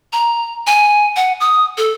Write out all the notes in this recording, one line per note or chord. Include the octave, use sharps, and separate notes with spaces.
A#5
G#5
F#5
D#6
A4